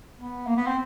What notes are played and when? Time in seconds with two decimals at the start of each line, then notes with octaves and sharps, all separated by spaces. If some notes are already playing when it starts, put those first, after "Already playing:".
0.17 B3
0.47 A#3
0.57 B3
0.67 C4